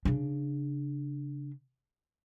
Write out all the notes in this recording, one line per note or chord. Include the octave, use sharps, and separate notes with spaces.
C#3 D4